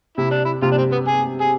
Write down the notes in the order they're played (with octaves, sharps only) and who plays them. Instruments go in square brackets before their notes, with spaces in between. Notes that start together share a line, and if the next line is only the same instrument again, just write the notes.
[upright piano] C3 [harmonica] E4
[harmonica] D4
E4
[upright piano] C3 [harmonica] F4
[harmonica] D4
C4
B3
G#4
G#4